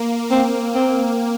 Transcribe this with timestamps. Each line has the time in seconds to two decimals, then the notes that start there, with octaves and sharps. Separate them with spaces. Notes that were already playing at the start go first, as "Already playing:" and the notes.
Already playing: A#3
0.30 A#3 C4
0.75 C4